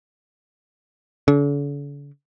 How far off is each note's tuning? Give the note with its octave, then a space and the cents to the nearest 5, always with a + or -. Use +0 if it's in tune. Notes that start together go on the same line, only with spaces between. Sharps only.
D3 -45